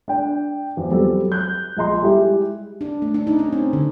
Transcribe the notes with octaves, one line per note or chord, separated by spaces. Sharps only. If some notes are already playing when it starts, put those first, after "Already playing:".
D4 G5
E2 F3
F#3 G3 C4 A4
F#6 G6
A#1 G#3 D#5 A#5 C6
G3 G#3 E4 G4
D4
A3
D4
D#4
C#4
C4
D3